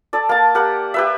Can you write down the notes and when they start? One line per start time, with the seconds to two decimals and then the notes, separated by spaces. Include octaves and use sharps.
0.13 A4 D5
0.29 A#3 A5
0.55 G4 A#4 F#5
0.94 G4 B4 E5